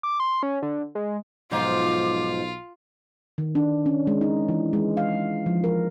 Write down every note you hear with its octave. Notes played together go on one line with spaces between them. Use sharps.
D6
C6
C#4
D3
G#3
B1 G#2 F3 F4 D6
D#3
D4
C#4
G#3
D#4
E3
G#3
F5
F3
A#4